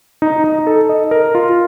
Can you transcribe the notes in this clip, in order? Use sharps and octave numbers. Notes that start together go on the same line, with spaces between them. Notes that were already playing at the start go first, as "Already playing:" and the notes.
D#4
D#4
A4
D#5
A#4
F4